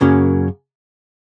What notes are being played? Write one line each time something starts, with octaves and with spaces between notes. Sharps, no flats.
F#2 C#3 F#3 A#3 C#4